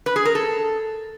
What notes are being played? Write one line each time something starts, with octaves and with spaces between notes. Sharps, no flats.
B4
G#4
A#4
A4